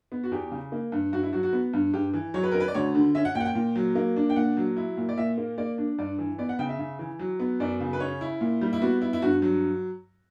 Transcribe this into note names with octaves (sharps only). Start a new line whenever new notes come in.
B3
F#4
E2 G4
C#3
A#3
G2
G2 F#4
E4
F#3 F#4
F#4
B3
G2
G2 G4
E3
F#3 C#5
B4
C#4 A#4
B4
D5
D2 C#5
D3
C#4 E5
F#5
A#2 G5
F#5
G5
A#2
F#3
A#3
D4
G5
A#2 F#5
F#3
E4
A#2
D5
A#2 E5
A#3
A#3 D5
D4
G2 D5
E3
B3 D5
F#5
C#3 G5
E5
C#3
E3
F#3
B3
F#2 D5
C#3
B4
C#4 C#5
E4
A#2
G3
E4
B3 F#4
E4
E4
G2 F#4
F#3